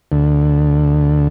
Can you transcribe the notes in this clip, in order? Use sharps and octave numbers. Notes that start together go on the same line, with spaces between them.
D2